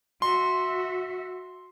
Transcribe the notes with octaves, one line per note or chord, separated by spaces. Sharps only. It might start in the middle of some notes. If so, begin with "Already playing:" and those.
F#4 E5 C6